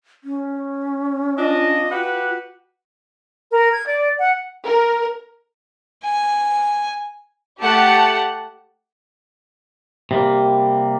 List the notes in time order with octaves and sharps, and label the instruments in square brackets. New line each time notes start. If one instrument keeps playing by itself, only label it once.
[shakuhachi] C#4
[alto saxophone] D4 [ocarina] F4 [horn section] D#5
[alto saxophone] F#4 [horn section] G4 B4
[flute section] A#4
G#6
D5
F#5
[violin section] A#4
[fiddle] G#5
[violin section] A3 G4 F#5 A5
[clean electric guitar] C3 G3 A#3